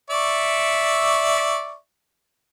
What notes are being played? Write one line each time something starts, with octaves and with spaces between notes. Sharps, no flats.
D5 E5 C#6